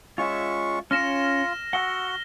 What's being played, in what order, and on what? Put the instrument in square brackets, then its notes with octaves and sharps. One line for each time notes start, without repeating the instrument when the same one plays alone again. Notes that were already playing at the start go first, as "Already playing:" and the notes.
[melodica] G#3 C#4 C#6 [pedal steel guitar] F4 E5
[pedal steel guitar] C#4 C#5 [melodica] F4 [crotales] F6 A#6 E7
[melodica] F#4 [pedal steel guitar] F#5 E6 [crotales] G7